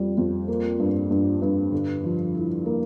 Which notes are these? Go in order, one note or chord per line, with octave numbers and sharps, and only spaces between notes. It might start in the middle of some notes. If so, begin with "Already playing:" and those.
Already playing: F2 G3
F2
A#3
G2
G2
G2
D3
F3
E4
A#3